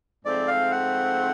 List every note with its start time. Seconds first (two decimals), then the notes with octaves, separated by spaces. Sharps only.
0.25 G#2 F3 A3 C4 D5
0.47 F5
0.72 F#5